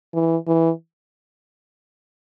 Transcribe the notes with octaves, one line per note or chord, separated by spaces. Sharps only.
E3
E3